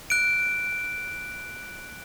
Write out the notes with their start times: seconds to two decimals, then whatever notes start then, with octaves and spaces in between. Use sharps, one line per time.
0.10 F#6 D7